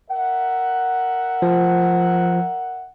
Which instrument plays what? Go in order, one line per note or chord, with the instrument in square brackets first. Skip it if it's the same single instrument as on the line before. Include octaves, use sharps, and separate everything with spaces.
[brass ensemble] A#4 E5 F#5
[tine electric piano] F3